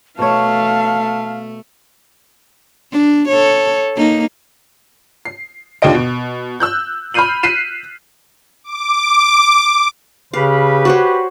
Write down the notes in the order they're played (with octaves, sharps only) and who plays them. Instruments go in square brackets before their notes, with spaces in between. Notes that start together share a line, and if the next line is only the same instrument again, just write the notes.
[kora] B2 C#5 [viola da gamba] A3 [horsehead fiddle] F5 [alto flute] A5
[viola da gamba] D4
A4 C#5
A#3 D#4
[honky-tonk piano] C7
D#2 D3 F4 G4 D#5 D7
B2
E6 F#6 G6
B5 F6 G6 C7 D#7 F#7
F#6 B6 C7 D#7 E7
[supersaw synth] D6
[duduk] C#3 [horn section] G4 B4 [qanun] F5
[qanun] F#4 C5 C#5